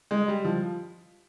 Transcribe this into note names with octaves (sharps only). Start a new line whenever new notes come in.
G#3
G3
F3